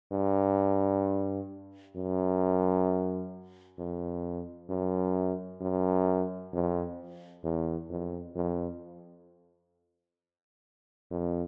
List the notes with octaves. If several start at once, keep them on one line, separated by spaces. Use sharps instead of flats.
G2
F#2
F2
F#2
F#2
F2
E2
F2
F2
F2